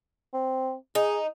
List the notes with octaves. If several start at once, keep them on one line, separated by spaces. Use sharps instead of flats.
C4
D#4 G#4